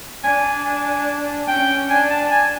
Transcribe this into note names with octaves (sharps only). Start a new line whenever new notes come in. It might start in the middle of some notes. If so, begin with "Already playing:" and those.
D4 G#5
G#5
C#4 G5
D4 G#5
A5
G#5